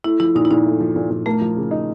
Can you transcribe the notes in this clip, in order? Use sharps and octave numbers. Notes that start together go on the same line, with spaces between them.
A3 E4
F3 E4
A#2 D#4
E4
A#2 D#4
A3
F3
A#2
A#2
A3 A#3
F3
C#3
D#4